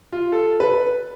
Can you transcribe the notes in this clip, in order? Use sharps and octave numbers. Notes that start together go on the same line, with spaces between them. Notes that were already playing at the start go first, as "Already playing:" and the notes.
F4
A4
B4